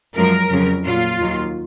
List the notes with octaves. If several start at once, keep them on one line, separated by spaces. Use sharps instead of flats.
F#2 F3 G#3 A#4
F2 C#3 F#3
A#2 F#3 F4
D#2 D#3 F#3